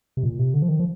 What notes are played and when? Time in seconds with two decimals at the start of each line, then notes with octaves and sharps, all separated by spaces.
0.17 C3
0.24 A#2
0.39 C3
0.54 D3
0.62 F3
0.68 D#3
0.80 F3